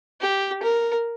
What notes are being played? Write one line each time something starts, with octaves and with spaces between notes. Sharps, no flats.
G4
A#4